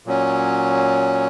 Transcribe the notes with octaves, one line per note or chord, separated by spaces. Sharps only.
A#2 F#3 C#4